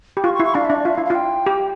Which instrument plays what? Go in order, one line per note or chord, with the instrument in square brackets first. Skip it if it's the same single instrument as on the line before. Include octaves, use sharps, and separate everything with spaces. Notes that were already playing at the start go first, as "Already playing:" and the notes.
[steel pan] G4
[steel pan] F4 [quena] C#6
[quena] C#6
[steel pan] E4
[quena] C#6
[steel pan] D4 [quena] F5
[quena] E5
[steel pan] D4
[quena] D5
[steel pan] F4 [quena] E5
[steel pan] E4 [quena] F5
[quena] F5
[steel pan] F4 [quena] G5
[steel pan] G4